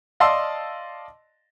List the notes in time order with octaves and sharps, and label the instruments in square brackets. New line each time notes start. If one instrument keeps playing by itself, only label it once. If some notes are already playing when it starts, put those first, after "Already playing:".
[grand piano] D5 D#5 F5 A5 C6 E6